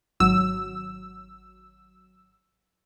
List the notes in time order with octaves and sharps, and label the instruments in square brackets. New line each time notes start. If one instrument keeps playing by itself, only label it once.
[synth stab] G#1 F#3 E6